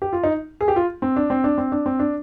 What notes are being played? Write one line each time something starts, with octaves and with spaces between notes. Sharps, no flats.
G4
F4
D#4
G#4
G4
F4
C4
D4
C4
D4
C4
D4
C4
D4